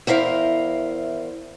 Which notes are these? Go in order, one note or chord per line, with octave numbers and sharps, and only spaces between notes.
E2 E4 A#4 C5 F5